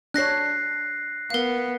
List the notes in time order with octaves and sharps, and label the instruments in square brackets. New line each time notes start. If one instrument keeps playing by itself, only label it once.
[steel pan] D4 C#5 [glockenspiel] F#6 A#6 C7
[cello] B3 [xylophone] A#4 F5